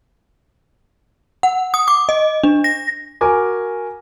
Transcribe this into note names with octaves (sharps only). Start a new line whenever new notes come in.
F#5
D#6
D6
D#5
D4
A#6
F#4 A#4 G#5 D6